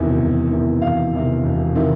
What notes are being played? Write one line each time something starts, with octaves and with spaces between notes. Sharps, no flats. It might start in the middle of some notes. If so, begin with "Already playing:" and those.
Already playing: E1 E2 C3 D#3
E1
E2 C3 D#3
E1 F5
E2 C3 D#3
E1
C3 D#3